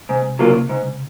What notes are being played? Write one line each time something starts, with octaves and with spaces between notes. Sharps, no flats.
G#2 C3
C#3 F#3 A#3 F4
G#2